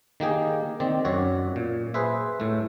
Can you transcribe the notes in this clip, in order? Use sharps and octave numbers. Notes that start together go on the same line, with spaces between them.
D#3 A#3 G4 G#4
D#3 C4 D5
F#2 F#4 C#5 D5 F#5
A#2
G#4 B4 C5 E5
A2 A3